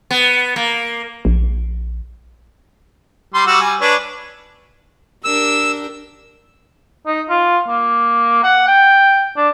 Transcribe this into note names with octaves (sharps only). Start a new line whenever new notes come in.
B3
A#3
A#1
G3 C6
G3 F#4 E6
G3 G#5
D4 B4 C#5
D4 G4 A#4 E6
D#4
F4
A#3
F#5
G5
D4